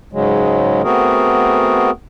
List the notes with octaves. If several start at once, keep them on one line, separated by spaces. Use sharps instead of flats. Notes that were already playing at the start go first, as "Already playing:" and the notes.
G#2 C#3 F#3 G#3
A3 B3 C4 F#4 G#4 A#4